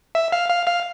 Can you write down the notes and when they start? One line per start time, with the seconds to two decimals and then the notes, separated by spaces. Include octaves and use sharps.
0.15 E5
0.32 F5
0.49 F5
0.67 F5